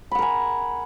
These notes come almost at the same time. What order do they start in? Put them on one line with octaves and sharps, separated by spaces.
B5 F#5 A#4 G#5